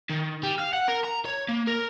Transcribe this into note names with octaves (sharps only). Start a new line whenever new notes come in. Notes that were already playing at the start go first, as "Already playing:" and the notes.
D#3
G3
F5
F#5
A#4
A#5
C#5
A#3
A#4